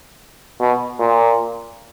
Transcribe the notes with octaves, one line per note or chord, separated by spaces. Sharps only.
B2
A#2